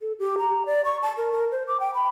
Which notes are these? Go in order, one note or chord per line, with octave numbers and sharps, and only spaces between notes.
A4
G4
A#5
D5
C#6
A5
A#4
A#4
C5
D6
G5
B5